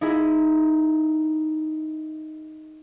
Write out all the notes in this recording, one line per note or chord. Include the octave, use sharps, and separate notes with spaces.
D#4 E4 G#4